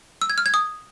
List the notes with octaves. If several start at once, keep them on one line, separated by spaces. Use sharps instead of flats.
E6
G#6
F6
G#6
D#6